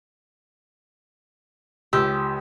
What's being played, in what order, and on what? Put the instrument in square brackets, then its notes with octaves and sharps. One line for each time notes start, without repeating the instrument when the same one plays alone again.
[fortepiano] C#2 E6 [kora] G4